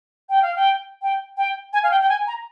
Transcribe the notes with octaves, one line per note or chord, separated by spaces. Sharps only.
G5
F5
G5
G5
G5
G#5
F5
G5
G5
G#5
A#5